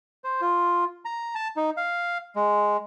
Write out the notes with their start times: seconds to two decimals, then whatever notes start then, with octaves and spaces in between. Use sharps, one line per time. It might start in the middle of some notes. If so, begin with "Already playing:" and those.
0.24 C5
0.41 F4
1.05 A#5
1.35 A5
1.56 D#4
1.77 F5
2.36 G#3